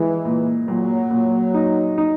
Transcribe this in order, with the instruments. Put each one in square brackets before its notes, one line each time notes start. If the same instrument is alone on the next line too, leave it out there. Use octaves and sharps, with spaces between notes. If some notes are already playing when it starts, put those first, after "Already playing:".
Already playing: [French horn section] E3 [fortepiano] G#3
[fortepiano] A#2
[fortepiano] A#2 [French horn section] F#3
[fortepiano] A#2
D#4
D#4